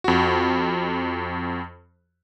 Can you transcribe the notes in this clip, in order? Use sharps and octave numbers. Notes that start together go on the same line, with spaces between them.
F2 F#4